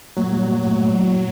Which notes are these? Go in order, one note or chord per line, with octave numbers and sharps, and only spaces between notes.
A#2 F#3
G3
A#2
A2 F#3
A2
F#3
A#2